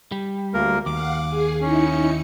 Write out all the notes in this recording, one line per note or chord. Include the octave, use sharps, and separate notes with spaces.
G3
D2 A#3 A#4
D#2 F5 F#5 D6
G#4 C7
C#4 D#4 E4 C#7